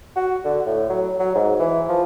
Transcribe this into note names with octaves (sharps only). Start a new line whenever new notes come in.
F#4
D3
A2
F#3
F#3
G#2
E3
F3